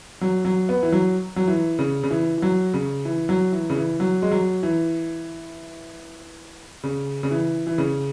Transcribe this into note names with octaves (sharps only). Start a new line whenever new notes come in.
F#3
F#3
B3
E3
F#3
F#3
E3
C#3
C#3
E3
E3
F#3
C#3
E3
F#3
E3
C#3
E3
F#3
G#3
F#3
E3
C#3
C#3
E3
E3
C#3